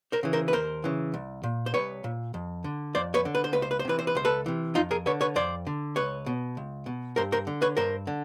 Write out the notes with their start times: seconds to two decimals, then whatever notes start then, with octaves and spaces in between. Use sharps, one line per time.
0.12 A#4 C5
0.23 C#3 E3
0.33 A#4 C5
0.48 B4
0.53 D#2 A#4 C5
0.84 C#3 E3
1.14 C2
1.43 A#2
1.66 C5
1.74 C2 B4 C#5
2.04 A#2
2.34 F2
2.64 D3
2.95 F2 C5 D5
3.14 B4 C#5
3.25 D3
3.35 B4
3.44 C5
3.53 C#2 B4
3.62 C5
3.71 B4
3.79 C5
3.85 C3 E3 B4
3.99 C5
4.07 B4
4.15 C#2 C5
4.25 A4 B4
4.46 C3 E3
4.75 F2 D#4 F4
4.91 G#4 A#4
5.06 D3 B4 C#5
5.21 B4 C#5
5.35 F2 C5 D5
5.67 D3
5.96 C#2 B4 C#5
6.26 B2
6.57 C#2
6.86 B2
7.16 G2 A#4 C5
7.32 A#4 C5
7.47 D3
7.62 B4 C#5
7.77 G2 A#4 C5
8.07 D3